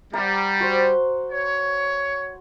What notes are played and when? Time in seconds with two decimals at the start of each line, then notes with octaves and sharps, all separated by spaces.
0.13 G3 F#5 A#5
0.60 F#4 C5
1.32 C#5